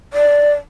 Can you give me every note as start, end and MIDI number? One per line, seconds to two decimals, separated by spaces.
0.13 0.52 74